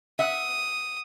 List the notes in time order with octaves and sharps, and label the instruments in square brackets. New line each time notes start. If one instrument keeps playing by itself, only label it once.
[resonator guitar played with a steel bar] E5 F#5 [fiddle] D#6